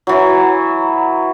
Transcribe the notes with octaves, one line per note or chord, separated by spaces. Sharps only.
E3 F#3